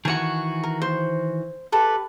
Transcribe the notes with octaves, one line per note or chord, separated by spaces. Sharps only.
D#3 E3 F#4 G#5 C#6
A#4
C5
G4 A4 B4